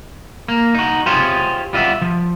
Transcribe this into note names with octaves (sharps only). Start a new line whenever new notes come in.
A#3
D#4 F#4
F4 G4 G#4 C5 C#5 F5
G3 F4 D#5 E5 F#5
F3